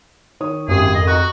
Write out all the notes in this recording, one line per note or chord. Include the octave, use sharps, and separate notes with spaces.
D#3 C#5 D#6
G#1 F#2 G4 G#4
F2 A#4 D#5
F#4 D#5 A#5 C#6